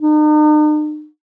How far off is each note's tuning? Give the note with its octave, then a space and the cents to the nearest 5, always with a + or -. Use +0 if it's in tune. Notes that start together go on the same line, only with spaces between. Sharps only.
D#4 -45